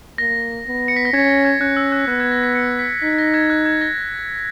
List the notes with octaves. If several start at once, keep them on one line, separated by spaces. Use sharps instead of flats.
A#3 A#6
B3
C#7
B6
A#6
C#4 G#6
A#6
G#6
C#4 F#6
E6
F#6
B3 F#6
G#6
A#6
B6
C#7
B6
D#4 B6
A#6
G#6
F#6
G#6
A#6